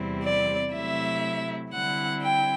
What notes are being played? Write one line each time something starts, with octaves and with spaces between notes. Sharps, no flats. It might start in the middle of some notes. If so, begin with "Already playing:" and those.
Already playing: E2 C3 G3 C4 E4
D5
C3 F#3 A3 E4 E5
D3 G3 C4 E4 F#5
G5